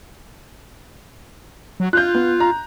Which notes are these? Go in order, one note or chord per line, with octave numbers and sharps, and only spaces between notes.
F#3
F4 F#6 G6
B3
A#5